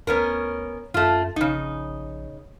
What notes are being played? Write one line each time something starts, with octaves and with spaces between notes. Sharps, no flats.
D2 B3 C#4 A#4
F#2 A3 F4
A#1 C#3 D#4